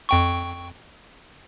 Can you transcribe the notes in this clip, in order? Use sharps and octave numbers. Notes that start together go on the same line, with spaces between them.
F2 G5 C#6